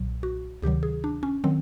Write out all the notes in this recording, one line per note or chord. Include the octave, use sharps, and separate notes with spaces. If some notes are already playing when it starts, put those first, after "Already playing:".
Already playing: B1 A#2 F#3
F#4
D2 C3 D#3 F#3 G4
G#4
D4
C#4
D#3 F#3 C4